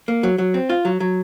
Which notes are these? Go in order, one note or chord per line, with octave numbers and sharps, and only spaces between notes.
A#3
F#3
F#3
C4
F4
F#3
F#3